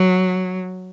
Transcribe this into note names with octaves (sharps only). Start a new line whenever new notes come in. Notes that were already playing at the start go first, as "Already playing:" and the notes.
Already playing: F#3